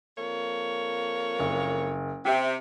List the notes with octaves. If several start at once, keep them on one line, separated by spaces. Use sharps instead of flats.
F2 A#3 C#5
F#1
C3 G4 E5 G5